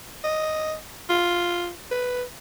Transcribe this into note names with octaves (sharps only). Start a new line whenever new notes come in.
D#5
F4
B4